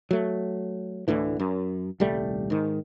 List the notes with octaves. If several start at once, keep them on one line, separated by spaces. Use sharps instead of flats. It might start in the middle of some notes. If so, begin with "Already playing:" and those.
F#3 A3
D2 A2 D3 E3
F#2
D#1 C2 G3 A3
G#2 D#3